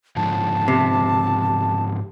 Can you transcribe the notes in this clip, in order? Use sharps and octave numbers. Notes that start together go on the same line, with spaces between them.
G#2 D3 F3 A5
C3